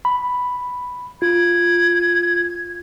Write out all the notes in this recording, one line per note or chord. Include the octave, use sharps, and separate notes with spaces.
B5
F4 G#6